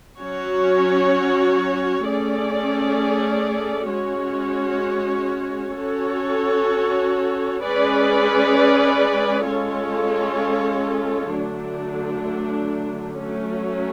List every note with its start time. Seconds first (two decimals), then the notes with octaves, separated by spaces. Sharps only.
0.19 F#3 C#4 F#4 C#5
2.04 A3 C#4 G#4 D5
3.91 G#3 C#4 F#4 C#5
5.76 C#4 F#4 A4 C#5
7.62 G#3 C#4 G#4 B4 D5
9.47 G#3 C#4 F4 A4 C#5
11.33 D3 F#3 A3 D4
13.19 F#3 A3 C#4